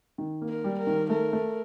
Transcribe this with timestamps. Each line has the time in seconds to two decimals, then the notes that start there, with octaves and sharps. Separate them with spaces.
0.18 D#3
0.42 A#3
0.49 A#4
0.64 G3
0.80 A#4
0.87 D#3
1.10 A3 A#4
1.33 A3